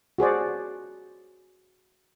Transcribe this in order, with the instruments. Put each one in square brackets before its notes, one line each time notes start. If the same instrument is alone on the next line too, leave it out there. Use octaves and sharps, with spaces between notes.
[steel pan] F#4 G#4 C5 D5